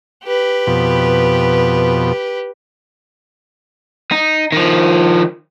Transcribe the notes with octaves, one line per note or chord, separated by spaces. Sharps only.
G4 B4
F2 B2
D#4
D#3 F3